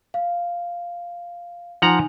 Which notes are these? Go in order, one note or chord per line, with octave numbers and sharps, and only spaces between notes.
F5
F3 D#4 F#5 G#5 A#5